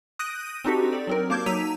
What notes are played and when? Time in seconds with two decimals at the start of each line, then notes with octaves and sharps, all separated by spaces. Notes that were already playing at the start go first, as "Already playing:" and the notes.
0.19 D#6 F#6 G6 A#6 D7 D#7
0.65 C4 D4 D#4 F#4 G4 A4
0.93 D5
1.07 F#3 C4 A#4
1.30 A#3 A#4 A5 D6 G6 G#6
1.46 F#3 D#4 E6 B6 D#7 F7